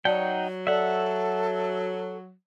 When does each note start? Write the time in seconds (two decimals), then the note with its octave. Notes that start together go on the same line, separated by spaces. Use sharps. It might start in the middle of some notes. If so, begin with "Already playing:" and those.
0.05 F#3 D#4 D5 F#5 G5 A5
0.67 A4 D5 E5 F#5